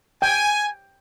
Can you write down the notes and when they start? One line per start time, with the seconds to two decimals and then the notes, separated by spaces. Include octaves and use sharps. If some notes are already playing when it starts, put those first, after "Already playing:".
0.22 G5 G#5